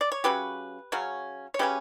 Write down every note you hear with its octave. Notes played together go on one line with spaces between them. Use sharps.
D5
C#5
C#3 F#3 C#4 G4 B4
C#3 F#3 C#4
C#5
C#3 F#3 C#4 G4 B4